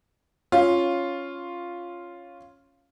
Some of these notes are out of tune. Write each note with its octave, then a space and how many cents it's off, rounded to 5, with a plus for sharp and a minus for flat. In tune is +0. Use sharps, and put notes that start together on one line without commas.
C#4 +0 F4 +0